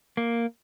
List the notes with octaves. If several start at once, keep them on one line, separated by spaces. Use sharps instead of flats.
A#3